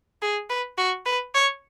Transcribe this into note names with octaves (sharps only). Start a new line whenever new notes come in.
G#4
B4
F#4
B4
C#5